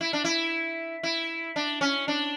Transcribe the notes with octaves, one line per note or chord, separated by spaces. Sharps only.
E4
D4
E4
E4
D4
C#4
D4